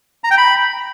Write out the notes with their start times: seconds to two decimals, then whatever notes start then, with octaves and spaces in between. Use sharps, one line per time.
0.24 A#5
0.31 G5
0.38 B5